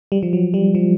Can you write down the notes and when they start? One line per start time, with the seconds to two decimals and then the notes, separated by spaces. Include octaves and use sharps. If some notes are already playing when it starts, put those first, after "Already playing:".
0.12 G3
0.23 F3
0.33 F#3
0.54 G3
0.75 F3